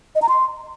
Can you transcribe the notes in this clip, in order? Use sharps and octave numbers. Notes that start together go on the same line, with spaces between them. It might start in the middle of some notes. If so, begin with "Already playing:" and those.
D#5
A#5
C6